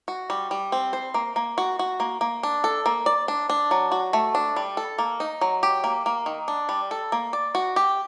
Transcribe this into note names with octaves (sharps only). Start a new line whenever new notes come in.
F#4
G3
G3
C4
C5
A#3
A#3
F#4
F#4
A#3
A#3
D4
A4
A#3
D5
D4
D4
F#3
F#4
A3
D4
G3
A4
A#3
D#4
F#3
G4
A#3
A#3
D#3
D4
G3
A4
A#3
D5
F#4
G4